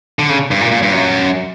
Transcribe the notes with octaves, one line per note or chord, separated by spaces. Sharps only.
D3
C#3
G2
A#2
A#2
G2
F#2